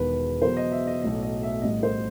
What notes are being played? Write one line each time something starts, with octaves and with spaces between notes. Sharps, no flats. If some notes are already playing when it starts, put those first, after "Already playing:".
Already playing: E1 E2 D#3 B4
E2 B2 F#3 C5
D#5
E5
D#5
B1 A2 F#3 D#5
D#5
E5
A1 A2 G3 D#5
C5